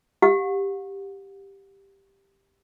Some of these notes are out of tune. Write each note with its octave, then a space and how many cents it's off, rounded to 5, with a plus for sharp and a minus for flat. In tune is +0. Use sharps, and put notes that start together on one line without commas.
G4 +0 F#5 -40